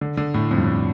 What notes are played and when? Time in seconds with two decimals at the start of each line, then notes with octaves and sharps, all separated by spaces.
0.01 D3
0.17 D3
0.34 A2
0.51 F2
0.58 G2
0.66 F2